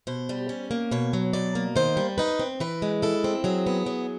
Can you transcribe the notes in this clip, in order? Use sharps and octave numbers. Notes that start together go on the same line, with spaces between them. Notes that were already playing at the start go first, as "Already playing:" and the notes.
B2 C5
G3
C#4
A#3
B2 C#5
F#3
B2 D5
A#3
D#3 C5
G3
D#4 B4
C4
E3 B4
G#3
E4 A4
C4
F#3 G#4
B3
F#3